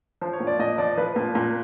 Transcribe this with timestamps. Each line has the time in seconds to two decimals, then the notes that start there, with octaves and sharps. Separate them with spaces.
0.21 F3 C5
0.33 C#5
0.40 A#2
0.47 D5
0.59 A#2 D#5
0.78 F3 D5
0.97 F3 B4
1.16 A#2
1.35 A#2